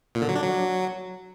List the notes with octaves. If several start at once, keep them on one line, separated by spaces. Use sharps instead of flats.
A#2
D3
F#3
D4
F#3